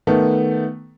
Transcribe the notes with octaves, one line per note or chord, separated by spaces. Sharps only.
D#3 A3 B3